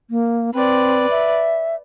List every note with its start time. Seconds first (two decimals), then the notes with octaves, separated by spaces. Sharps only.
0.10 A#3
0.54 C4 B4 D5
1.10 E5